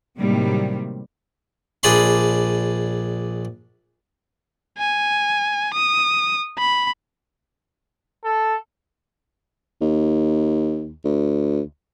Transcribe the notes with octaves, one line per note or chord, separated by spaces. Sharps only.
A2 C3 D#3 F#3 G3 A#3
A#1 D4 G#4 D5 B5 C6
G#5
D#6
B5
A4
D#2
D2